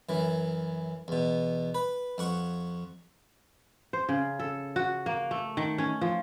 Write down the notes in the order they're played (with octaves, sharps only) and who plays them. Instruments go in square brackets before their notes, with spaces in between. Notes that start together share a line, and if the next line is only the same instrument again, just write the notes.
[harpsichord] F#2 E3
E2 B2
B4
F2 F#5 C#6
[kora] C5
C#3
A4
F#4
A#3
A3
D#3
C#4
F3